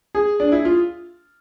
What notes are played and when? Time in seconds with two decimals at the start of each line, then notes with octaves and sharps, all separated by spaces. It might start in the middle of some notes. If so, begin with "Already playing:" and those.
0.15 G#4
0.40 D4
0.52 E4
0.65 F4